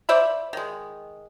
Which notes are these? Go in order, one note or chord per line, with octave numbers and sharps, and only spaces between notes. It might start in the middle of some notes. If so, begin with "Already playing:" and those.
C5 D5 E5 B5
D#3 G#3